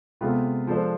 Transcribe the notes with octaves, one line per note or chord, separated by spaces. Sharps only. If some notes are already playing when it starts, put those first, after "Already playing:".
C3 G#3 B3 F4 A4
F3 G#3 D4 A4 C5